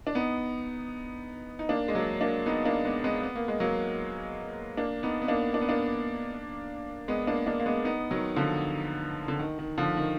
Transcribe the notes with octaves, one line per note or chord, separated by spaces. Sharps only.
D4
B3 D#4
D#4
A#3 D4
G#3
F#3 A#3
A#3 D4
B3 D#4
A#3 D4
G#3 B3
G#3 B3
B3
A#3
G#3
F#3 A#3
A#3 D4
B3 D#4
B3
A#3 D4
D4
B3
A#3 D4
G#3 B3
A#3 D4
A#3 D4
A#3
G#3 B3
B3 D#4
D#3 F#3
D3 F3
D3
D#3
D#3
D3 F3
D#3